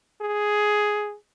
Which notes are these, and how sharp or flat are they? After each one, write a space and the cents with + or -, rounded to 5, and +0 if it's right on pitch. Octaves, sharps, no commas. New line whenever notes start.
G#4 +5